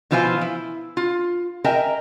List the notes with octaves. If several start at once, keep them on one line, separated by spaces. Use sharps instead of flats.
B2 E3 F3 E4 F4 G#5
E4
F4
A#4 D#5 E5 G5 G#5 A#5